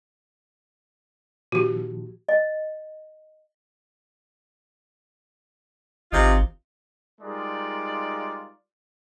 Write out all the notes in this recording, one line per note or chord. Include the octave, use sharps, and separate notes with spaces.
A#2 D#3 F3 F#4 G4
D#5
G#1 C3 D#4 F4
G3 G#3 D#4 F4 A#4 D5